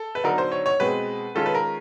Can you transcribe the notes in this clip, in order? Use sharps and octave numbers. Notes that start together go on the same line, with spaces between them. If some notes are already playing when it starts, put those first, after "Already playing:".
Already playing: A4
B4
D3 F#3 B3 D#4 A#4
C5
C#5
C#5
B2 G#3 C4 B4
D#3 G#3 C#4 F4 A4
B4
A#4